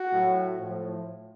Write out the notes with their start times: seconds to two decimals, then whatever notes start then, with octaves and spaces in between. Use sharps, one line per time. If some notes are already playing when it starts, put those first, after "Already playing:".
Already playing: F#4
0.13 A2 F#3
0.59 A2 F3